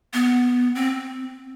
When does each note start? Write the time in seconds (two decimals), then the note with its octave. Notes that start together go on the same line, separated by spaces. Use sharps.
0.14 B3
0.75 C4